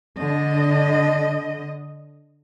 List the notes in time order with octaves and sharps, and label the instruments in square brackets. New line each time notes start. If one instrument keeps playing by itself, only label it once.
[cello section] D3 D#5